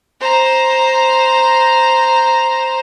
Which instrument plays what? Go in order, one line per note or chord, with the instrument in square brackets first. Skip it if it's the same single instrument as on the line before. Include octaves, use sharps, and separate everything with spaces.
[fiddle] C5 A#5